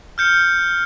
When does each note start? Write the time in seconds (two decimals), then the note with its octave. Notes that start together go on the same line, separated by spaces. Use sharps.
0.18 F6 G6 C#7